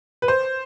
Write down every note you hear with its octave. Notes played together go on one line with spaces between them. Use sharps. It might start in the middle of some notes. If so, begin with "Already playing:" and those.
B4
C5